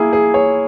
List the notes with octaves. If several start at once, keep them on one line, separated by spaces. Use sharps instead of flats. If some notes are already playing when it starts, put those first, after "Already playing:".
Already playing: A#3 E4 G#4
G#4
C#5